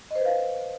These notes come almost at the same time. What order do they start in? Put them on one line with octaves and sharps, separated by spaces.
D#5 C5 B4 F5